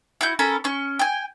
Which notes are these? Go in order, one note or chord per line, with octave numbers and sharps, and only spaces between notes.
E4 F#4 G6
C#4 A4 A#4 B5
C#4 C#6
G5 G#5